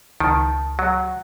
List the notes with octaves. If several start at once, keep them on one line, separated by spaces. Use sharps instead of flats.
C#2 D#3 A5
F#3 F#5